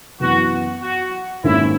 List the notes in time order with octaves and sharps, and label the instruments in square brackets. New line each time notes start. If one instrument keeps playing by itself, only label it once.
[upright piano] F#2 E3 B3 [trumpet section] F#4
[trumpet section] F#4
[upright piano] G#1 G#2 D#3 A#3 C#4 [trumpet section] E4